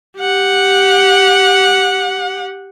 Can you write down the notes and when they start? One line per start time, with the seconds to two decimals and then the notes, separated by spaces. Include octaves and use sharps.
0.18 G4 F#5